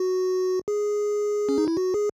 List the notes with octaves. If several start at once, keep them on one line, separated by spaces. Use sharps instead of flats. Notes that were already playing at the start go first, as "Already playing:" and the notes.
Already playing: F#4
G#4
C#4
D#4
E4
F#4
G#4